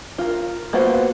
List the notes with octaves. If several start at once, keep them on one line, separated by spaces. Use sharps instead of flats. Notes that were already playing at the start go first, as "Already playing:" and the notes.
F4 A#4
A#3 B3 F4 F#4 C5